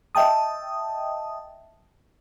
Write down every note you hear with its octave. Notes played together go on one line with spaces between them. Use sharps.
D#5 E5 G5 A5 D#6